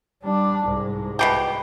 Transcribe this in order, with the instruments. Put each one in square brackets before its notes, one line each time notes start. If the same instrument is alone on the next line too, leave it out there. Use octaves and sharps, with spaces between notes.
[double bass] G3 D4
C2 G#2
[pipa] B2 F3 G4